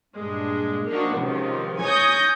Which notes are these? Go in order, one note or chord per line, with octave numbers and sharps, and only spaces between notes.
G2 A#2 G#3 D4
F3 A#3 D4 D#4 F#4
C#2 C3 D#3 F3
C#5 G#5 D#6 G6 A#6